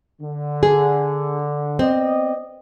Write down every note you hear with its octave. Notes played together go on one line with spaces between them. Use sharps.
D3
G#4
B3 C4 D5 D#5